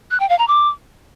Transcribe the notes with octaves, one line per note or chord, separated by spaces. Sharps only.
F#6
G5
F5
A#5
D6